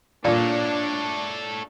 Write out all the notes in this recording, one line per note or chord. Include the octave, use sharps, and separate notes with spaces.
A#2 D4 A4 C#5